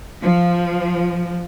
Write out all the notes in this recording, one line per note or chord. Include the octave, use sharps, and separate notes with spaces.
F3